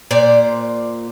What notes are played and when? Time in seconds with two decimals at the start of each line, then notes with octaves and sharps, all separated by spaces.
0.11 A#2 C5 D5